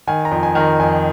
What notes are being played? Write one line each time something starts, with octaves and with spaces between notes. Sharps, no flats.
D#3 G#5
A#5
F2
G#5
D#3
A#5
F2 G#5